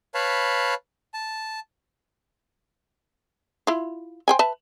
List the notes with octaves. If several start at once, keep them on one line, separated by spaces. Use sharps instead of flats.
B4 C#5 F5 A5 B5
A5
E4 F4
C5 G5 G#5
B4 E5 A5